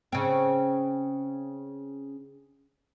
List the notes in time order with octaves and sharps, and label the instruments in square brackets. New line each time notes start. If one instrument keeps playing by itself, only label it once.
[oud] C#3 C4